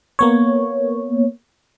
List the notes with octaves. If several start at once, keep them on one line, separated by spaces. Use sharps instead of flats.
A#3 B3 C#5